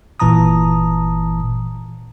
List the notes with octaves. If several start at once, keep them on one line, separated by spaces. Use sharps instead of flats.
G1 A#2 E3 A5 A#5 D#6